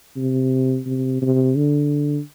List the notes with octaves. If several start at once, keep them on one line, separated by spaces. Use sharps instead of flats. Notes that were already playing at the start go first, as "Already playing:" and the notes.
C3
C3
C3
D3